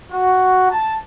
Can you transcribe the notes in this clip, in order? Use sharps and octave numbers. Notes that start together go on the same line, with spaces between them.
F#4
A5